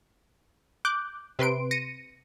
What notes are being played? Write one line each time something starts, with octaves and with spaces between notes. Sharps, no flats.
D6 F#6 G6
C3 B4 C6 D7
A#6 C#7 D#7